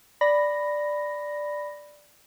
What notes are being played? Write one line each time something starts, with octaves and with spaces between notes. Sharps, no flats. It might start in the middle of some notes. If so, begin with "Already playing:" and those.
D5 B5 A#6